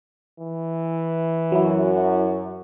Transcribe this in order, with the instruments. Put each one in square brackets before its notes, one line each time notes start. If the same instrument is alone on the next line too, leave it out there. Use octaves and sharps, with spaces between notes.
[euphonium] E3
[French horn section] F#2 F#4 [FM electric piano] F#3 E4